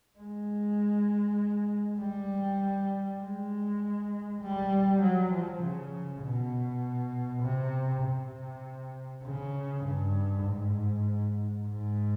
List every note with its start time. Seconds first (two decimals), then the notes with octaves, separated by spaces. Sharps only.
0.19 G#3
2.00 G3
3.21 G#3
4.41 G3
5.01 F#3
5.32 F3
5.62 C#3
6.23 B2
7.42 C3
8.03 C3
9.24 C#3
9.84 G2
10.45 G#2
11.66 G#2